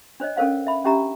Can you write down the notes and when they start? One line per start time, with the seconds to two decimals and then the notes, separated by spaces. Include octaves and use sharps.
0.20 D4 C5 C#5 D#5
0.36 C#4 A4 A#4 C5 F5 F#5
0.67 E5 B5
0.84 C#4 D4 G4 E5 A#5